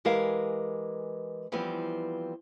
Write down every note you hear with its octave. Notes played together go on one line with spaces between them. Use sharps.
E3 G#3 G4 A#4 B4 F5
E3 F3 G3 B3 C4